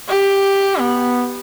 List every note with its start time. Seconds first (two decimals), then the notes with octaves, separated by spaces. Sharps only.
0.08 G4
0.79 B3